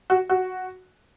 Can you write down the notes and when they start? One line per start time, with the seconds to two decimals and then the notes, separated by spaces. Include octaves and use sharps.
0.10 F#4
0.29 F#4